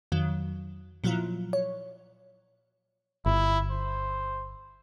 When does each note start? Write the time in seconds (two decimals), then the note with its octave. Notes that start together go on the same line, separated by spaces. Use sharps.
0.12 F2 D#3 F#3
1.04 A#2 F3 F#3 E4 F4
1.53 C#5
3.26 G1 E4
3.71 C5